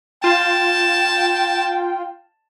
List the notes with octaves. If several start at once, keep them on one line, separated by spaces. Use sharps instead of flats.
F4 G5 A5